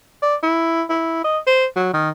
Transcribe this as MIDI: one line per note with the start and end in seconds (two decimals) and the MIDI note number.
0.22 0.36 74
0.43 0.83 64
0.90 1.20 64
1.24 1.39 75
1.47 1.66 72
1.76 1.91 54
1.94 2.10 51